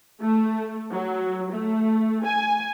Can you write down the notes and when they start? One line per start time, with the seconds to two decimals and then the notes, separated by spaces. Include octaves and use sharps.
0.21 A3
0.92 F#3
1.51 A3
2.25 G#5